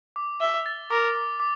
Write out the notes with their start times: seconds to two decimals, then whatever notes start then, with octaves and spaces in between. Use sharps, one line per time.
0.16 D6
0.41 E5 G7
0.66 A6
0.91 A#4 D6
1.15 D6
1.40 D6